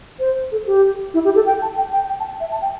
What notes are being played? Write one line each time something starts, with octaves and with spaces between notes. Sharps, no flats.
C5
A4
G4
E4
G4
A4
G5
A5
G5
G5
G5
A5
E5
A5
G5